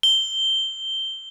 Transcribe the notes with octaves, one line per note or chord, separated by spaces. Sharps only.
G7